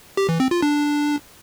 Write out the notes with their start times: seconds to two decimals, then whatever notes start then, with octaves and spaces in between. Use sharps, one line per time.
0.17 G4
0.29 E3
0.40 C4
0.51 F4
0.62 D4